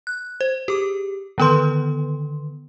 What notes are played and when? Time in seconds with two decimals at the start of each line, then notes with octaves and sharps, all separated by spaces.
0.07 F#6
0.41 C5
0.68 G4 G#4 D6
1.38 D3 D#3 B3 A4 B4 C6